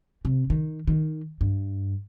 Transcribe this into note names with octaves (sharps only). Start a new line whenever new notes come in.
C3
D#3
D#3
G2